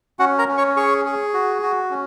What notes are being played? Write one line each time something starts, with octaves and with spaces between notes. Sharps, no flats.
C#4 F#4 F#5
A#4 A#5
C#4
C#5 C#6
G#4 C#5 C#6
G#4
F#4
F#4
C#4